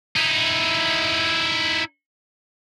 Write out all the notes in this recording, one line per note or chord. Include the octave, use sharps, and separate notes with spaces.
D#4 E4